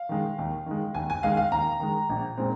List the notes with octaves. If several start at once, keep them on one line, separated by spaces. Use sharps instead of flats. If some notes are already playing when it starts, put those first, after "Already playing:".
Already playing: F5
D#3 G#3
D#2
D#3 G#3
D#2 G#5
G#5
D#3 G#3 F5
F5
D#2 A#5
D#3 G#3
A#1
A#2 G#3 C4